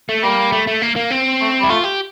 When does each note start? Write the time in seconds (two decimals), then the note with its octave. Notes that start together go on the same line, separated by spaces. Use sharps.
0.09 A3
0.23 G3 A#3
0.52 A3
0.67 A3
0.82 A#3
0.96 A#3
1.11 C4
1.41 A3
1.60 G3 E4
1.69 A3 F4
1.84 G4